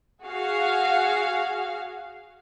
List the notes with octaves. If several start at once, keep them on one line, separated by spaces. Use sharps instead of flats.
F#4 G#4 F5